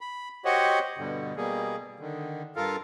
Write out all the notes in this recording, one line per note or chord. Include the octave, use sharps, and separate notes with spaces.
B5
F#4 G4 C5 C#5 D#5 F#5
G2 B2 D3
B2 G3 A#3 G#4
D3 D#3
G2 F4 A4 A#4 F5